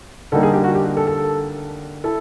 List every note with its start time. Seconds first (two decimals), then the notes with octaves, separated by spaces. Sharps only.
0.32 D3 G3 A#3 D#4 A4
0.43 G#4
0.54 G4
0.64 F#4
0.75 G4
0.97 A4
1.07 A4
2.04 E4 A4